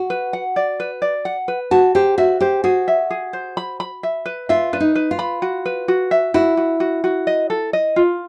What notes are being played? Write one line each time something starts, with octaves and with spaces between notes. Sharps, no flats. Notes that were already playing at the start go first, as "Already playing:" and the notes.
Already playing: F#4
B4
F#5
D5
B4
D5
F#5
B4
F#4 A5
G4 C5
F#4 E5
G4 C5
F#4 G#4
E5
G#4
C5
B5
B5
E5
B4
F4 E5
D4 B4
D#4
B4
F4
B5
F#4
B4
F#4
E5
E4 F#4
F#4
F#4
F#4
D#5
A4
D#5
F4